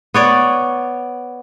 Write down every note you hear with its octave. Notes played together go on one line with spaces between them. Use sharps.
B3 C#5 D5